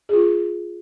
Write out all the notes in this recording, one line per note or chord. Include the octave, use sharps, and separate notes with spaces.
F4 G#4